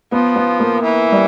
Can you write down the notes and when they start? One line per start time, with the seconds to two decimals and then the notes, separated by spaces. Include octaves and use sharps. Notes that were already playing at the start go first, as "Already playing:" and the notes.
0.12 F3 B3
0.36 B3
0.60 A#3
0.83 E3
1.12 G3